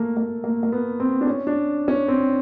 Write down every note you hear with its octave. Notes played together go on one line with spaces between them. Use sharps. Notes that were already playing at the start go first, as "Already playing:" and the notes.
Already playing: A3 A#3
A#3
A#3
A#3
B3
C4
D4
C#4
D4
C#4
C4